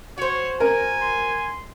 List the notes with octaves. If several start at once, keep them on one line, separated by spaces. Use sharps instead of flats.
F#4 C5 C#5
A#4 G#5
C6